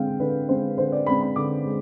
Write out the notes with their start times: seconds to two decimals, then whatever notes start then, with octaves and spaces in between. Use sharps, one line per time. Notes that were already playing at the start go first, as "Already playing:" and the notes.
Already playing: D3 G#3 C4 F5 G5
0.19 D3 B4
0.49 G#3 C4 C5
0.78 D3 C5
0.92 D5
1.07 G#3 C4 B5
1.21 B5
1.36 D3 D6
1.66 G#3